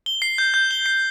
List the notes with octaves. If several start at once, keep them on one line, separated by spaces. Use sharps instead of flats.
G7
C7
G6
G6
G7
C7